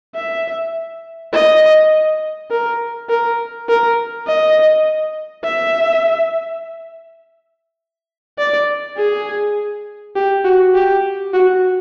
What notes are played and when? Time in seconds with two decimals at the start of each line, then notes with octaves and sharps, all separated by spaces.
0.15 E5
1.34 D#5
2.51 A#4
3.09 A#4
3.69 A#4
4.27 D#5
5.45 E5
8.39 D5
8.97 G#4
10.16 G4
10.45 F#4
10.75 G4
11.34 F#4